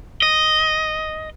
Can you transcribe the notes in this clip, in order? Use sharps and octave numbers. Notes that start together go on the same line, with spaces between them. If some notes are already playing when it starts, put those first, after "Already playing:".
D#5